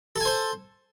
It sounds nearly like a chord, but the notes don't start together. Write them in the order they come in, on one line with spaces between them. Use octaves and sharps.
A4 G#5 C5